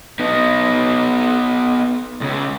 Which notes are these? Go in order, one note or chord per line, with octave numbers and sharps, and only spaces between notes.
B3 D#4
C#2 C#3